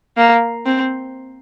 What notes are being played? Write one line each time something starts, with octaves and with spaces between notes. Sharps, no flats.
A#3
C4